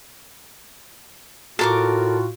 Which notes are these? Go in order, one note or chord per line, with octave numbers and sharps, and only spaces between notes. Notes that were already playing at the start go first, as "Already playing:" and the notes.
A2 F4 F#4 A4 A#4 D6